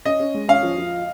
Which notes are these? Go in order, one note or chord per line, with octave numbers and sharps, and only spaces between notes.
C#4 D#5
C#4
G#3
C#4 F5
F3
F3